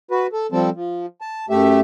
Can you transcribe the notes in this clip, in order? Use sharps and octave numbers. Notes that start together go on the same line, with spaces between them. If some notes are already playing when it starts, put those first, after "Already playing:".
F#4 B4
A4
F3 G3 C4 A4
F3
A5
F#2 A3 G4 E5